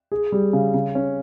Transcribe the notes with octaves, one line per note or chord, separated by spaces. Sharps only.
G#4
G3
C#3
C#3
C#4